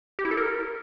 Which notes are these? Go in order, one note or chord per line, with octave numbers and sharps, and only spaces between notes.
G4
E4
A4
A#4